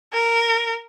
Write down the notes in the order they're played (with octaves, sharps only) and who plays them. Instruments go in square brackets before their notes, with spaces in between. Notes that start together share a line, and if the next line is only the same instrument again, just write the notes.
[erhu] A#4